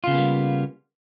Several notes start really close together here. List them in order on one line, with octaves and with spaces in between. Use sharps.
F4 C#3 B3 A#3 G3